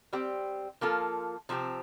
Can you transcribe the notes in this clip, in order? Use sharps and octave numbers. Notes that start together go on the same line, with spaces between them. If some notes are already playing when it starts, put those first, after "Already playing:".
G3 C4 G4
F3 A#3 F4 A4
C3 F3 C4 G4